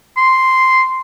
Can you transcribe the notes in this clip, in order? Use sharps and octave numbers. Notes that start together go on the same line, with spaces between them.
C6